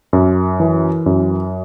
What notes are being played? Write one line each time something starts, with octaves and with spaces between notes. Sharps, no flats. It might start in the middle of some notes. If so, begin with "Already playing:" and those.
F#2
E3
F#2